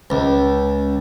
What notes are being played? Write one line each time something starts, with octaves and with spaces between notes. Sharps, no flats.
C#2